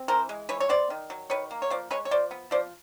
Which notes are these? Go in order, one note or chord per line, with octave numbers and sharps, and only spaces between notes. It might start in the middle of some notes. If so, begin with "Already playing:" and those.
Already playing: C4
E3 A#4 C5
G#3
E3 B4 C#5
C#5
B3 C5 D5
D#3
F#3
D#3 B4 C#5
A#3
C#5
F3 C5 D5
G#3 B4 C#5
C#5
F3 C5 D5
B3
F3 C5 D5